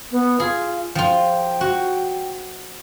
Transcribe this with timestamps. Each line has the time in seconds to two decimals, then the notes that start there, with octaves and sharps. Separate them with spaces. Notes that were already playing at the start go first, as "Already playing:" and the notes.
0.11 B3
0.40 F4 G#4
0.95 F3 F4 G5
1.61 F#4